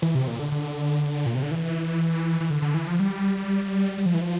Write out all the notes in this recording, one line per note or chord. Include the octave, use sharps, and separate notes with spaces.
E3
C3
A#2
D3
D3
A#2
C3
D3
E3
E3
D3
D3
E3
F3
G3
G3
F3
E3
F3